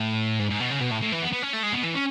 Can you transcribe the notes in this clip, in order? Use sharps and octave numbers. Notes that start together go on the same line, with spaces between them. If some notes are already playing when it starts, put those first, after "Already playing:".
Already playing: A2
G#2
G#2
B2
C#3
B2
A2
A2
E3
B3
B3
C#4
A3
G#3
B2
E3
C#4